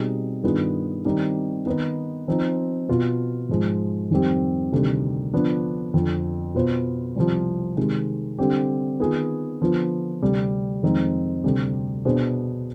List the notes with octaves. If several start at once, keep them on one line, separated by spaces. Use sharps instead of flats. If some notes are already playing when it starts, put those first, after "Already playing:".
Already playing: B2 G3 C4 D#4 G#4
G2 D#3 B3 F4 G#4
D#3 G3 C4 D#4
D#3 B3 D#4 B4
F3 C4 D#4
B2 B3 F4
G#2 F3 G#3
F2 D#3 G3 C4 G4
D2 C3 D#3 G3
D3 F3 B3 D4 F4
F2 D3 F3
B2 B3 F4 C5
C2 C3 F3
C3 D#3 G#3
D3 G3 C4 G4
D#3 B3 F4 G#4
D3 F3 B3 F4
D2 C3 G3
F2 D#3 G#3 C4 D#4
D2 C3 G3
B2 B3 D4 G#4 C5